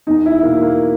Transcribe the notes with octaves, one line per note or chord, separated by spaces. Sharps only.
E2 D#4
E4
B2 A#3
A#3